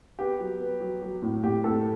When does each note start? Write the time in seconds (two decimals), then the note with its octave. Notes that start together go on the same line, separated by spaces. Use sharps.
0.19 B3 G4
0.40 F#3
0.60 B3
0.81 F#3
1.02 F#3
1.22 A2
1.43 A2 G4
1.64 A2 A4